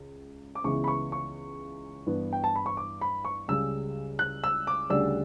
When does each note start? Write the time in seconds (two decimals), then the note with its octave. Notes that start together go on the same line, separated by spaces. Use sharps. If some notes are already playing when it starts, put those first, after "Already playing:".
Already playing: C#2
0.55 D6
0.64 C#2 C#3 E3 B3 E4 C#6
0.84 B5
0.88 C#6
1.12 C#6
2.06 G2 E3 B3
2.33 G5
2.44 A5
2.55 B5
2.66 C#6
2.77 D6
3.01 B5
3.25 C#6
3.48 C#2 C#3 G3 E6
4.19 F#6
4.44 E6
4.67 D6
4.90 D2 C#3 G3 D4 E6